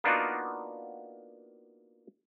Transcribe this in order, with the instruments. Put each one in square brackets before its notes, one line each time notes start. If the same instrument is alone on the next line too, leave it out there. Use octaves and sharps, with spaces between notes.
[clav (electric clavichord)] A#3 B3 D4 D#4 F4 F#4